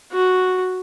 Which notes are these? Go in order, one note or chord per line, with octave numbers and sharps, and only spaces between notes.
F#4